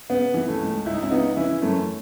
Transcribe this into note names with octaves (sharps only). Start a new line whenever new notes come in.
C#3 B3
E3
A3 C#4
C#2
C#2 E4
D#4
C#4 E4
C#3 B3 D#4
E3 C#4 E4
F#2 A3 C#4